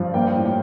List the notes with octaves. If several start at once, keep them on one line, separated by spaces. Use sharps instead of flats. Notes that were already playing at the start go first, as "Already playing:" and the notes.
Already playing: G2 F3
A#3 G5
A2
G5